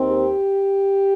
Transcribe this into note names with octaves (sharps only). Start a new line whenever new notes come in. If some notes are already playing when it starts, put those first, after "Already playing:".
Already playing: D#2 D#3 C4
G4